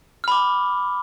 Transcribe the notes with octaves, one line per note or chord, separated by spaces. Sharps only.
B5 D6 F6